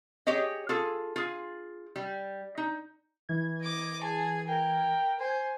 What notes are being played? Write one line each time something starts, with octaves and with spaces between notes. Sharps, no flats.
G4 G#4 C#5 D#5
F4 G#4 A4
F4 G#4
G3
D#4
E3 G#6
D#5 D6
G#4 G#5 A5
A#4 G5
C5 G#5